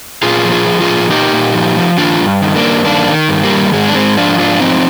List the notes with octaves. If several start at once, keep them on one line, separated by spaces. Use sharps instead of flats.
A#2 F4 G#4
F3
F4 G#4
F3
F4 G#4
A#2
A#2 D#4 G4
A#2
F3
F3
D#3 D4 F4
G2
D#3
A#3 D4
G2
D#3 A#3 D4
D#3
G2
G3 A#3
D#3
G#2 G#3
D4
G#2 G#3 C4
F3 D4 F4
G#2 D4 F4
F3 C4 D#4